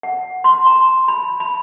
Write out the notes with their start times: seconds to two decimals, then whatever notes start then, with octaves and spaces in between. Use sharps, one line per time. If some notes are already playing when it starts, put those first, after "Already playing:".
0.03 F#5
0.44 C6
0.66 A#5
1.08 B5
1.40 B5